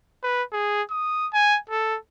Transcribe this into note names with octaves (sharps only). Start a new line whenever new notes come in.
B4
G#4
D#6
G#5
A4